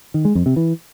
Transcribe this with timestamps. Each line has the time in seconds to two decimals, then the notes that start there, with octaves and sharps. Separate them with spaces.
0.14 D#3
0.25 G#3
0.35 F2
0.46 C3
0.56 E3